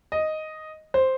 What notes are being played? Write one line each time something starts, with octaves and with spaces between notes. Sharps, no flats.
D#5
C5